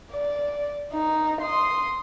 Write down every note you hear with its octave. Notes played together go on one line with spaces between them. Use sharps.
D5
D#4
C6 D#6